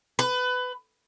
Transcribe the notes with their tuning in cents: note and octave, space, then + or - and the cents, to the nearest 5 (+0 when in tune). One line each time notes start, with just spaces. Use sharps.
B4 +20